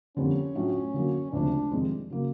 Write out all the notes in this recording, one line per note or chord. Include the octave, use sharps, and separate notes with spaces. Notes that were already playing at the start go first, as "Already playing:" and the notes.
F2 D3 G3 A#3 C#4
A2 F#3 A3 D4 F4
D3 F#3 A#3
D2 C#3 F3 G#3 C4 D4
F2 C3 D#3 G#3
C#3 F#3 A#3